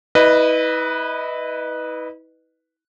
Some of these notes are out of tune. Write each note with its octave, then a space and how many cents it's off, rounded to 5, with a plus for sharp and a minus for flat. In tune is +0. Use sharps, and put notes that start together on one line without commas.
E4 -40 B4 +0 D#5 -25